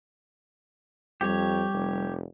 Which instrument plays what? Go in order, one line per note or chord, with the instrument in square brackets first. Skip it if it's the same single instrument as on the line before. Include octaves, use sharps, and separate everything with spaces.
[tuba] F2 [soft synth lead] G3 [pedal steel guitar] G4 C#5
[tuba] F1